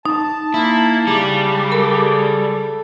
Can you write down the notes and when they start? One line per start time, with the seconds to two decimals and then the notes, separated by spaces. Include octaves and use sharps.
0.06 D#4 A5
0.54 A#3 E4
1.07 C#3 G3
1.72 A4 A#4